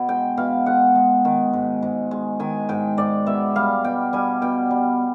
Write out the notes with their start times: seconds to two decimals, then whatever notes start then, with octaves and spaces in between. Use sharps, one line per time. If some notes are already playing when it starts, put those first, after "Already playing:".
Already playing: B2
0.09 G#3 G5
0.37 B2 F5
0.66 G#3 F#5
0.95 G#3
1.25 D#3
1.53 G#2
1.83 G#2
2.11 G#3
2.40 D#3 G#5
2.69 G#2 G5
2.97 G#2 D5
3.26 B2 E5
3.56 G3 F5
3.84 B2 G5
4.13 G3 G#5
4.42 B2 G5
4.71 G3